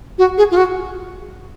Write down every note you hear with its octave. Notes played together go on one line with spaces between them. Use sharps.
F#4
G#4
F4
F#4